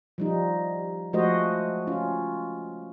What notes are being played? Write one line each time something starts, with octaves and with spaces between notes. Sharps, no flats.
F3 G3 D#4
F3 G#3 A3 F#4 C5 D#5
C#4 F4